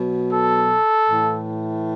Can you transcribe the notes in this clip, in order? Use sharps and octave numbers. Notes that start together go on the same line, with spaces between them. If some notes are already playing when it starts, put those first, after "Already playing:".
Already playing: B2 F#3
A4
A2 E3